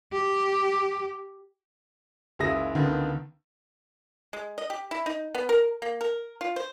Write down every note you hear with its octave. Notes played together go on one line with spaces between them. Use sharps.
G4
F#1 C#2 G#3 E5 D#6 A#6
C#2 D3 D#3 B3
G#3
D#5
G4
E4
D#4
B3
A#4
A#3
A#4
F4
C5